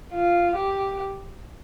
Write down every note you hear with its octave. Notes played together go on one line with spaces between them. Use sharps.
F4
G4